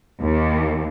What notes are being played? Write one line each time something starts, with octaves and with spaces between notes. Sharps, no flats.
D#2